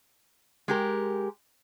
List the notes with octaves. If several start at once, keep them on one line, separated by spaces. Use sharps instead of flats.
G#3 G4 A#4